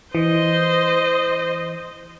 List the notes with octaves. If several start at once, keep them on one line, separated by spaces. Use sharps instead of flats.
E3 C5 D#5